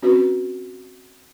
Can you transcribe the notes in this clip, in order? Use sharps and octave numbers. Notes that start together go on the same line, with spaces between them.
C4 C#4 F#4 B4